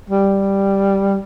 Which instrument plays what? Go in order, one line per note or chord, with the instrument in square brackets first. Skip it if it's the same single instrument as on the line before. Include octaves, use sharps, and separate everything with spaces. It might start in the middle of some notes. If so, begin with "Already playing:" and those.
[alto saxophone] G3